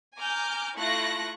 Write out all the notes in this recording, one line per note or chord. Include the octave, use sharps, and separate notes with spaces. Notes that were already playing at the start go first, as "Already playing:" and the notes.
G#5 A#5 D6 F6 G6
A3 E4 F4 C#6 F#6 A#6